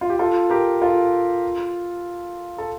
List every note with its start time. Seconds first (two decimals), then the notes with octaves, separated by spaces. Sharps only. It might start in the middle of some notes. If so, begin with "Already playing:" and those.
0.01 F4
0.10 G4
0.19 F4 A4
0.50 G4 A#4
0.81 F4 A4
2.58 A4